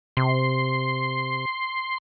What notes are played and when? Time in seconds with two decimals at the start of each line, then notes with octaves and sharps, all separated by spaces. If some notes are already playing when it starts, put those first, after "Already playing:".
0.17 C3 C6